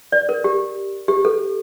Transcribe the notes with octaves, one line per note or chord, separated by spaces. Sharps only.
D5
A#4
G4
G4
A4